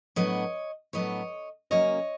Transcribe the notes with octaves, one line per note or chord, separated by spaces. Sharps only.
A2 F#3 B3 D4 C#5 D#5
A2 F#3 B3 D4 C#5 D#5
C#3 F#3 A#3 C#4 C#5 D#5